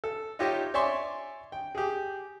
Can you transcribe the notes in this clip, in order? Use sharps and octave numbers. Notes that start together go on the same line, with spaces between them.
A4
D#4 F4 G4 C#5 D#5 E5
C#5 D5 E5 G#5 C6 C#6
G5
G4 G#4